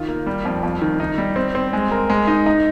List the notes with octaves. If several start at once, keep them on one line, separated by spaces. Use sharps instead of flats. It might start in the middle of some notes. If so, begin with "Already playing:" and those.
Already playing: D#3 F4
A#3
G3
F2
F2
D#3
D#4
G3
C4
C4
G#3
A#4
G#3
D#4
D#4